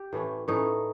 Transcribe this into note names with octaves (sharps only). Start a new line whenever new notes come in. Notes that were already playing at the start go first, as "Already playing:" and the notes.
Already playing: G4
A2 E3 A3 C#4
A2 E3 A3 C#4 D#4